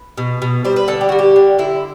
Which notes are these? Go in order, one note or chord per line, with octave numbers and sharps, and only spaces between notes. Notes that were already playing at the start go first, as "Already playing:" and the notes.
Already playing: B4
B2
B2
G3 C5
B4
D3 A4
G4
G3 F#4
G4
D3
D3 E4